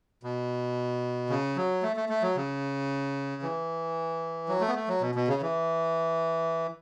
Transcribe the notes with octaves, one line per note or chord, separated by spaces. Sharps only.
B2
C#3
F#3
A3
A3
A3
F#3
C#3
E3
F#3
A3
B3
A3
F#3
B2
B2
C#3
E3